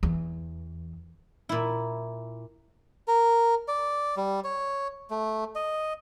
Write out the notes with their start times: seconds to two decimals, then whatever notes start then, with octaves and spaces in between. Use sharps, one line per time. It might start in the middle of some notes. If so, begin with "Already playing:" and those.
0.03 E2
1.49 A#2 E4
3.08 A#4
3.68 D5
4.17 G3
4.44 C#5
5.10 A3
5.55 D#5